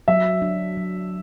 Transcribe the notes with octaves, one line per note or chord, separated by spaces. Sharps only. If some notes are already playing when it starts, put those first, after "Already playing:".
F#3 E5
D4
F#3